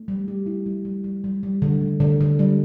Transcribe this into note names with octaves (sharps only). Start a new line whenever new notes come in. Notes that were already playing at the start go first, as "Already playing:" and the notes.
Already playing: A3
G3
G4
E4
G3
G3
G3
G3
G3
D3
A3
D3
D3
G3